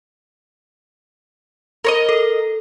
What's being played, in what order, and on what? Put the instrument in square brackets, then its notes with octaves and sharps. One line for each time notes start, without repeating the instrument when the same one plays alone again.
[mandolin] A#4 C#5 D#5
[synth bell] A4